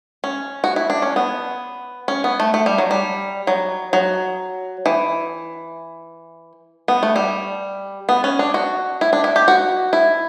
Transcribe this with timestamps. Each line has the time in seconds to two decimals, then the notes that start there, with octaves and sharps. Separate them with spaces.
0.24 C#4
0.64 F#4
0.76 E4
0.90 D4
1.02 C#4
1.16 B3
2.08 C#4
2.24 B3
2.40 A3
2.54 A3
2.66 G3
2.78 F#3
2.91 G3
3.47 F#3
3.93 F#3
4.86 E3
6.88 B3
7.03 A3
7.16 G3
8.09 B3
8.24 C#4
8.39 D4
8.54 F#4
9.01 E4
9.13 D4
9.24 E4
9.36 G4
9.48 F#4
9.93 E4